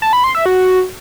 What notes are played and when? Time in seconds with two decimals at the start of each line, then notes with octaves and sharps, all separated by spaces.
0.02 A5
0.13 B5
0.24 C6
0.35 E5
0.46 F#4